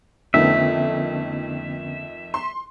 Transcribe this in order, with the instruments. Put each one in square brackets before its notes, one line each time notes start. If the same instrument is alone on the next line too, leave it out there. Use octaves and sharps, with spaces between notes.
[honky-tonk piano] F2 D#3 A3 [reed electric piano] D3 B3 C#4 [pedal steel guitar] E5
[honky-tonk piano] C6